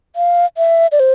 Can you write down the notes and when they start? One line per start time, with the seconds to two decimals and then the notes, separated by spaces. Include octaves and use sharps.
0.16 F5
0.57 E5
0.92 D5
1.00 C5